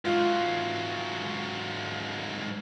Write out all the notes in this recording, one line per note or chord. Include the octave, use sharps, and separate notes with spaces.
G#2 F#3 F4